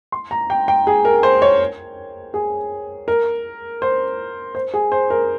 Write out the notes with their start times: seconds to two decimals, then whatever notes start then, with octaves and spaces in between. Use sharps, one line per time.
0.12 C6
0.31 A#5
0.50 G5
0.68 G5
0.87 G#4
1.05 A#4
1.23 C5
1.42 C#5
2.34 G#4
3.08 A#4
3.82 C5
4.55 C5
4.74 G#4
4.92 C5
5.10 A#4